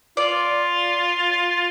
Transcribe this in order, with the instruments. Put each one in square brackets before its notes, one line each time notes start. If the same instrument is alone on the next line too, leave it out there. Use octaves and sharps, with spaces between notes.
[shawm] F4 [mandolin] D5